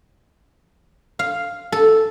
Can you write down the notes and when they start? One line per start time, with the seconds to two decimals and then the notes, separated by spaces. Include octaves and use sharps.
1.19 F5
1.72 A4